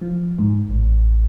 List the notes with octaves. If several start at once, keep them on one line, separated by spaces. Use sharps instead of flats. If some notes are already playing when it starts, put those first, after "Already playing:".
F3
G#2
A1